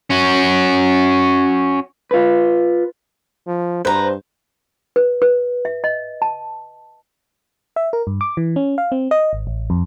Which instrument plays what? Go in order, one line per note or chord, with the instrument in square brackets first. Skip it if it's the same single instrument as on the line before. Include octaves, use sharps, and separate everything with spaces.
[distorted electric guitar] C#4 F#4
[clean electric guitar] F4 B4
[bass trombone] F3
[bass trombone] G2 [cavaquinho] B4 A#5 [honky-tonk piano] C5
[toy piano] B4
B4
E5
D#5
A5
[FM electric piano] E5
A#4
G2
D6
E3
C#4
F5
C4
D#5
G#1
A1
F2